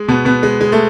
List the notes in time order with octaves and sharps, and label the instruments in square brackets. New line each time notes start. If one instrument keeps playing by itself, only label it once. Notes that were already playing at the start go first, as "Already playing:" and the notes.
Already playing: [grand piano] G#3
B2 B3
B2 B3
G#3
G#3
A3